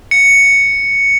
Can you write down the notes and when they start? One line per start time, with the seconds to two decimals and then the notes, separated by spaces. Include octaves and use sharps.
0.11 C#7